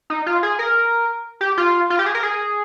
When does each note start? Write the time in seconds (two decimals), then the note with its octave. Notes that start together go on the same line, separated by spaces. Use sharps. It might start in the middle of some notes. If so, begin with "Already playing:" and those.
0.10 D#4
0.26 F4
0.43 G#4
0.59 A#4
1.41 G4
1.57 F4
1.90 F4
1.99 G4
2.06 G#4
2.15 A#4
2.23 G#4